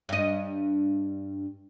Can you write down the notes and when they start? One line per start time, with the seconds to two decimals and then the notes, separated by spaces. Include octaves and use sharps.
0.09 G2 D#5